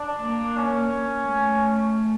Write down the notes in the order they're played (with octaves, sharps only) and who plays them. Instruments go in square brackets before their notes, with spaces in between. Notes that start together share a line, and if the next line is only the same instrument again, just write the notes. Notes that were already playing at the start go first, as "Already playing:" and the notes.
Already playing: [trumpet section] D4
[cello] A#3
[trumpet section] C#4
[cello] A3